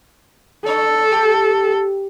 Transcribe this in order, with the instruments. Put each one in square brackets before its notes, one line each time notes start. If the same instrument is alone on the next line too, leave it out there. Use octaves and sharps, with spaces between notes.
[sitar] D4 C#5 [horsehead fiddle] A4
[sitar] G4